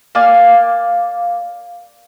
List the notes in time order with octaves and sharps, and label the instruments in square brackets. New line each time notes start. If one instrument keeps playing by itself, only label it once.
[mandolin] A#3 D5 F5 G#5